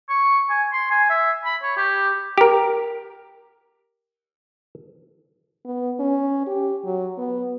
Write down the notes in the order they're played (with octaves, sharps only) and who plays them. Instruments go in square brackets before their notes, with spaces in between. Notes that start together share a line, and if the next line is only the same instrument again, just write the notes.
[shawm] C#6
G#5
C6
G#5
E5
B5
C#5
G4
[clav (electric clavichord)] G4 A#4
[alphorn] B3
C#4
G4
F#3
B3